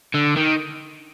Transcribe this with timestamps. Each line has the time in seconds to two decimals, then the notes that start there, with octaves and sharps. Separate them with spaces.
0.14 D3
0.36 D#3